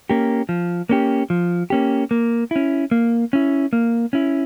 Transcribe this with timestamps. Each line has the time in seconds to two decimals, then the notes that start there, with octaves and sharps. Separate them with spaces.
0.10 A#3 C#4 G4
0.49 F3
0.89 A#3 C#4 G4
1.30 F3
1.70 A#3 C#4 G4
2.11 A#3
2.51 C#4 E4
2.91 A#3
3.33 C#4 E4
3.73 A#3
4.13 C#4 E4